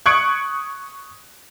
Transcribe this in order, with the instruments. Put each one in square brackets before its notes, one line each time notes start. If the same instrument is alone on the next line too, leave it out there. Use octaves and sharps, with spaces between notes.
[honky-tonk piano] C#6 D#6 F#6 G#6 C#7 D7